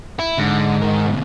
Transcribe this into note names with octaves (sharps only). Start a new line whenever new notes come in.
E4
G#2 D3
D#3 A#4
D2 B2